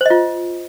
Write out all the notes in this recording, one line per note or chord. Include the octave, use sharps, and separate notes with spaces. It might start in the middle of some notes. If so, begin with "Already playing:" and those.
F4 C5 D#5